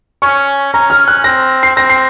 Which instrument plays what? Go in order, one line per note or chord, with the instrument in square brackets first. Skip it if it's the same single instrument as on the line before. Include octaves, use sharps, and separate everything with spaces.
[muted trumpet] C#4 [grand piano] C#6
[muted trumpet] C#4 [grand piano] A#5
[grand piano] F6
F#6
[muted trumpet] C4 [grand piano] A#6
[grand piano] C7
[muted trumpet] C4 [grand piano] A#6
[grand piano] C7